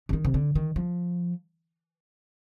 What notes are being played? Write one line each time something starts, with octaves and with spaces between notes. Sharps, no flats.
D3
D#3
C3
D3
D#3
F3